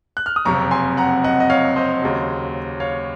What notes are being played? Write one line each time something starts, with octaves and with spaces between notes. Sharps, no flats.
F#6
F6
D#6
F#1 F2 C3 A#5 C#6
G#5 C6
F#5 A#5
D#5 F#5
D#5
C#5 F5
C5 D#5
D#2 C#3 F#3
C#5 F5